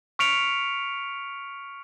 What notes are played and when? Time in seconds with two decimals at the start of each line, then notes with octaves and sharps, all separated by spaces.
0.19 C#6 F6 B6 C#7 D7 F7